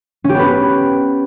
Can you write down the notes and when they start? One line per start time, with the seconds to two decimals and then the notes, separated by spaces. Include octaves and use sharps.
0.24 C#4
0.29 G4
0.34 B3
0.39 B4